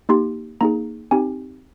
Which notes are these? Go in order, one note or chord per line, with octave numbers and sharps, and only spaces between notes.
A#3 D#4 G4 C6
A#3 D#4 G#4 A#5
C4 D#4 G4 G#5